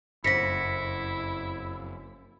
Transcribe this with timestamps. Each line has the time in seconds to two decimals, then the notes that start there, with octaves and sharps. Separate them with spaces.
0.24 F#1 F2 E4 F#5 A#6 B6 C#7